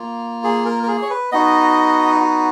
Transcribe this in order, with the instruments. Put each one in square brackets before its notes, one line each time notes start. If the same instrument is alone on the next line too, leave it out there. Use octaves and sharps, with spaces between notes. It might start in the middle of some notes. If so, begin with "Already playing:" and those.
Already playing: [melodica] A#3 F4
G#4
A#4
A#4
G#4
C#5
B4
B3 D#4 F#4 D#5
F#4